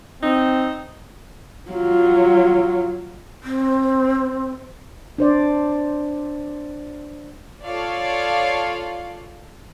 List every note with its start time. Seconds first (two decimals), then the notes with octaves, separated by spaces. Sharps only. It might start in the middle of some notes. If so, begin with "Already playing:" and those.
0.22 C4 D#4
1.69 F#3 F4
3.43 C4
5.18 D4 C5 D5
7.64 F4 A4 C#5 D5 F5